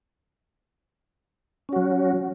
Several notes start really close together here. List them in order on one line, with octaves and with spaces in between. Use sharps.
C#4 F#4 F#3